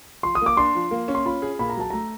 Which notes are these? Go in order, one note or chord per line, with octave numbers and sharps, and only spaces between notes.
F3 C6
D#6
A#3 D6
D4 C6
F3
A#3
C#4
C6
F4 B5
G#4
A#2 B5
A#5
F#3 A5
A3 A#5